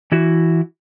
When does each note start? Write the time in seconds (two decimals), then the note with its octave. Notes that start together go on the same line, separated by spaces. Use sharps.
0.12 E3 E4 F#4